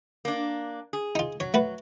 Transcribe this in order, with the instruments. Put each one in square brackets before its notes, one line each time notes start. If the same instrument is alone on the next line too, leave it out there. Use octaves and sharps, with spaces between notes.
[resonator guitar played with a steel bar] A#3 D4
G#4
[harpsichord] D#4 F4
[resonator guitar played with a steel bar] F#3 [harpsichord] C#5
[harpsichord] A3 F#4 B4